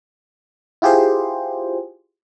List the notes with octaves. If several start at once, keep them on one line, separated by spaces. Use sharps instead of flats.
E4 F4 G4 G#4 C5